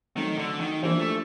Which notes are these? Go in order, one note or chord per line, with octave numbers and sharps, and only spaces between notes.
D#3 F#3 A3 C4
D3
D#3
E3 F3 A#3 D4 G4 C5
A3